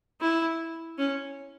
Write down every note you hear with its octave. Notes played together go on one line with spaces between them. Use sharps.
E4
C#4